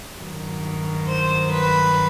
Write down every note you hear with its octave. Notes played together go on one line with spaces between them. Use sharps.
G2 D#3 F#3
C5
B4